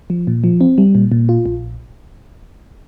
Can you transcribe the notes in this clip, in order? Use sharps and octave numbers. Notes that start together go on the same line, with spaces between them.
F3
A#2
F3
C4
G3
A#2
A#2
F4
A#1